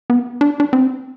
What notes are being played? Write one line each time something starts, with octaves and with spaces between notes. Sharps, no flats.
B3
D4
D4
C4